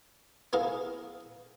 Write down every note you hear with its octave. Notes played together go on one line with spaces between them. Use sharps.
B3 E4 G#4 A#4 F5